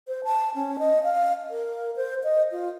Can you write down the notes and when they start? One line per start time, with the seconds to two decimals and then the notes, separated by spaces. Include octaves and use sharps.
0.08 C5
0.24 A5
0.55 C#4
0.79 D#5
1.04 F5
1.50 A#4
1.96 C5
2.24 D#5
2.52 F4